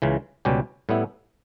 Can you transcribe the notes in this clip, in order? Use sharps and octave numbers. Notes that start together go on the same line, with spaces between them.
C#2 C#3 E3
C#2 B2 G3 C#4 G4
A2 G3 B3 E4